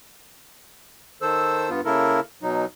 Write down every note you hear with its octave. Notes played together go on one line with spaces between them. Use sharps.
D#3 A4 C5 E6
G2 B3 F4
C#3 A#3 E4 A4 A#4
B2 F#3 D#4